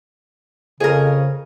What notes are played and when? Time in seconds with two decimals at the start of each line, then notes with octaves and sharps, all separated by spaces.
0.80 F2 C#3 G#4 A#4